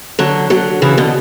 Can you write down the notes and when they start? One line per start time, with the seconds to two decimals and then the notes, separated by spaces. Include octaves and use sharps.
0.19 D3 F#3
0.50 D3 F#3
0.82 C#3 E3
0.97 B2 D3